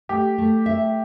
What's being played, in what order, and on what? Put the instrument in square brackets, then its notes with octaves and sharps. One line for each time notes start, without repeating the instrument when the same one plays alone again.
[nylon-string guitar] A3 [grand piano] G4
[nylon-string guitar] A3
E5